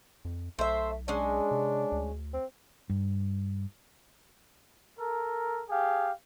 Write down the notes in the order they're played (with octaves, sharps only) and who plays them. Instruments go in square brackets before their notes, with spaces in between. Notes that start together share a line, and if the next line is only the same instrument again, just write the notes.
[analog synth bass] F2
[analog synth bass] B1 [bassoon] A3 [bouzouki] C5 E5
[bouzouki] G#3 C#4 [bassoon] D4
[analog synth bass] C3
D2
[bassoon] C4
[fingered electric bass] G2
[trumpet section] A4 A#4
G4 G#4 F5